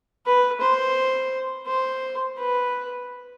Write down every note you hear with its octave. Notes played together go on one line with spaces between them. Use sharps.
B4
C5
C5
B4